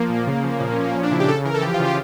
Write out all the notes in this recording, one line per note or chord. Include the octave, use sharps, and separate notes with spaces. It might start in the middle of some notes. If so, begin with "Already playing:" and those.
Already playing: F3 A#3
A#2
C#3
F3
A#2 A#3
C#4
A#2
A#3
F3 C#4
D4
C#3 E4
G4
C#3 A4
E3 A#4
A4
F3 G4
F4
C#3
G4